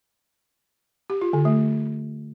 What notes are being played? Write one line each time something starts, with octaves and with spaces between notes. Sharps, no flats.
G4
F4
D3
A3